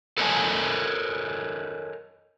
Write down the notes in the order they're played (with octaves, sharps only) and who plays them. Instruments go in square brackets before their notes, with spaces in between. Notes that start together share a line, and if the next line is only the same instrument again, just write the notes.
[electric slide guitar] A4 A#4 C#5 D#5 G#5 A5